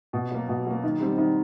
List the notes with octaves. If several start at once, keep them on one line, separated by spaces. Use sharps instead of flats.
B2
F#3 A#3
B2
F#3 A#3
D#3
G3 C4
D#3